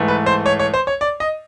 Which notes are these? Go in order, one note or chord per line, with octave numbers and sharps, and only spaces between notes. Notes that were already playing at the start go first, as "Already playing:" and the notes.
Already playing: G#2 E3 A3
B4
C5
C#5
C#5
C5
C#5
D5
D#5